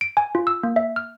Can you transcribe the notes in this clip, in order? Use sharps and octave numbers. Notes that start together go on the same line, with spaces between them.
D7
G#5
F4
E6
A#3
E5
F6